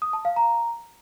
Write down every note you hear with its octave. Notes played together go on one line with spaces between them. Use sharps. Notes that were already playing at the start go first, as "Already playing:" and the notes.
D#6
A5
F5
A#5